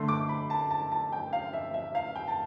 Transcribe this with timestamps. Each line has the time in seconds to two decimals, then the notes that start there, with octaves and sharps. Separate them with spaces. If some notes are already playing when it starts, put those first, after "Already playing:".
Already playing: D3 A3 C6
0.08 D6
0.29 B5
0.50 A5
0.71 A5
0.92 A5
1.12 G5
1.33 F5
1.53 E5
1.74 E5
1.95 F5
2.16 G5
2.28 A5